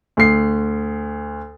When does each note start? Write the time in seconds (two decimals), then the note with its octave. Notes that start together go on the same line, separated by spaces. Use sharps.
0.17 D2 C7